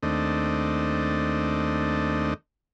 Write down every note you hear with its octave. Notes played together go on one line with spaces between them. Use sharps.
D#2 A3 C4 D4 D#5